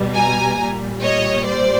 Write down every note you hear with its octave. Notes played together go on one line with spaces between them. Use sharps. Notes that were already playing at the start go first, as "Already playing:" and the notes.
Already playing: B2 G3
G#5 A#5
A#2 G3
C#5 D#5
C5 D5